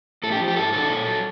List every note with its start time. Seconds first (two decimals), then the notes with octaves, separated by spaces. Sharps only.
0.23 A2 A4
0.32 G4
0.40 F3
0.48 G4
0.56 G#2 A4
0.73 D#3 F#3 A4
0.89 A#2
1.07 F#3